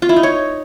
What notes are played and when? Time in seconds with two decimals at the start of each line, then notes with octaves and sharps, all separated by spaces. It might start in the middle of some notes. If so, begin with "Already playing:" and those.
0.02 F4
0.09 E4
0.16 D#4
0.23 C#5